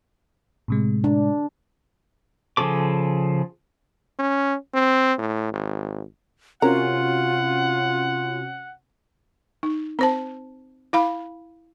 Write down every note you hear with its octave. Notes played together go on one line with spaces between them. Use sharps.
A2 C3 G#3
D4
C#3 F3 G#4 A4 D6
C#4
C4
A2
G#1
C3 C#4 F4 F#4 A#4 F#5
D#4
C4 C5 A5
E4 F5 B5